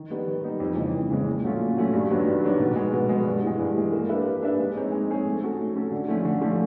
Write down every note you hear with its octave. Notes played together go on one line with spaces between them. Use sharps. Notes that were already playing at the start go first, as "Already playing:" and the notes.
Already playing: D#3
G3 B3 D#4
D#3
G3 B3 D#4
F2
C#3 E3 G#3
F2
C#3 E3 G#3
A#2
F#3 A3 C#4 F4
A#2
F#3 A3 C#4 F4
G2
D#3 F#3 B3 D4
G2
D#3 F#3 B3 D4
B2
G#3 B3
B2
G#3 B3
G2
E3 G#3
G2
E3 G#3
A#3
D4 G4 B4 E5
A#3
D4 G4 B4 E5
G#3
C4 D#4 G#4 C#5
G#3
C4 D#4 G#4 C#5
A3
C#4 F#4 A4
A3
C#4 F#4 A4
D3
F3 A3 C#4
D3
F3 A3 C#4